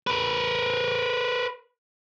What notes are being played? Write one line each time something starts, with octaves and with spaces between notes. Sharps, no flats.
A#4 B4